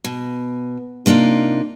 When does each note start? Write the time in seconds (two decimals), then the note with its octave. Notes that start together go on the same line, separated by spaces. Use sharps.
0.04 B2
1.06 C3 A#3 D4 D#4 F4